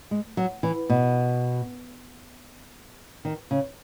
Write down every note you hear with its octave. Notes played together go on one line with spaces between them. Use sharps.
G#3
F#3
E3
B2
D#3
C#3